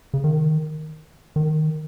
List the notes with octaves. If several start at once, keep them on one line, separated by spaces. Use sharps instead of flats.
C#3
D#3
D#3